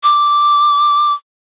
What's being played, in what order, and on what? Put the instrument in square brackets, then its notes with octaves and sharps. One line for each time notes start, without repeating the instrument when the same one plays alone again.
[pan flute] D6